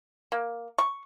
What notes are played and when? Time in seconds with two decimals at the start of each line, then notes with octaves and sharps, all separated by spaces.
0.32 A#3
0.78 C#6